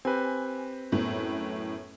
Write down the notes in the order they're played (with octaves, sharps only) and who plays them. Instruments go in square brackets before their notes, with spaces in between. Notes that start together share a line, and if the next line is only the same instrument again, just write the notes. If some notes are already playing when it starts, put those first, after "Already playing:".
[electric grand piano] C4 G4 B4 [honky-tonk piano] G#5
[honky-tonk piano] F#2 A2 B3